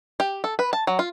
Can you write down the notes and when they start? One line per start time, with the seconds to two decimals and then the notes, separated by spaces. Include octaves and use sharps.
0.20 G4
0.44 A4
0.59 B4
0.73 A5
0.87 F#3
0.99 F4